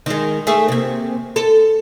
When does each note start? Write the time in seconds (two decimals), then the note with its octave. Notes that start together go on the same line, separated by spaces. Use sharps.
0.06 D#3 G#3
0.47 A3 G#4
0.68 C3 A#3
1.36 A4